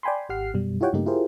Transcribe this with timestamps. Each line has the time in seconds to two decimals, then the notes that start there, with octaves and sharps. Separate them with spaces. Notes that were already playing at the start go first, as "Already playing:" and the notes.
0.03 D5 G5 G#5 B5 C6
0.29 G#1 G4 F#5 F6 C7
0.54 F#2 B2 G3
0.81 E4 F4 G4 C#5 F#5 G5
0.93 G2 C#3 A3 A#3 D#4 G4
1.06 E4 F4 G4 G#4 A#4 C5